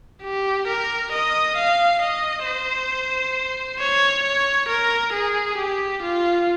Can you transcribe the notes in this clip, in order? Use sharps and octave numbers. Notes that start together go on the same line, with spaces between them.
G4
A#4
D#5
F5
D#5
C5
C#5
C#5
A#4
G#4
G4
F4